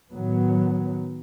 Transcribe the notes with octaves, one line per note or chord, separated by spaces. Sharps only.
A2 D#3 F#3 B3